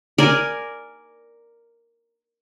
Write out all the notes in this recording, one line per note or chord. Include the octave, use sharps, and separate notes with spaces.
A#4 D5 G#5